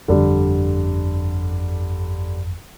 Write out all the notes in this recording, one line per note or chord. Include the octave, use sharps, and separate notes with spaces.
G1 F2 D3 G3